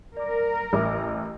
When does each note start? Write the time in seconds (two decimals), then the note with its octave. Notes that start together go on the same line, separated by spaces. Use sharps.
0.17 A#4 D5 D6
0.73 A1 E5 D6 F6